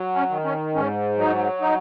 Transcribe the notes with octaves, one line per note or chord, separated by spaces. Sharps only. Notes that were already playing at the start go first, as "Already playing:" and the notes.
Already playing: F#3
C#4
D#3
C#4
G#2 C#4
F#3 D#4
D#4